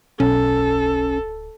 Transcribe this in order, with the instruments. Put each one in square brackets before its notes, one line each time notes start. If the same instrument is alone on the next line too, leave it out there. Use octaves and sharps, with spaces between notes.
[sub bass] D1 [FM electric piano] B1 [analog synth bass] C#4 [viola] A4